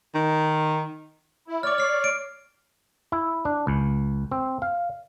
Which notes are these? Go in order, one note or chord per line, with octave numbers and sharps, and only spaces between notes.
D#3
E4
C#5 D5 D6 F6
F6 C7
D7
E4
D4
C#2
C4
F5